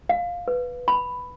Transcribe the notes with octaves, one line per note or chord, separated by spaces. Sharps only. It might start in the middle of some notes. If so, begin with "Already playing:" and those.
F5
B4
B5